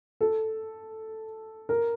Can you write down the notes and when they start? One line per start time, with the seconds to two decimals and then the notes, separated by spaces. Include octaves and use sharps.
0.21 A4
1.69 A#4